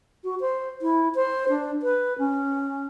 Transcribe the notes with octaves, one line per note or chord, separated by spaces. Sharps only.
F#4
C5
E4
C5
D4
B4
C#4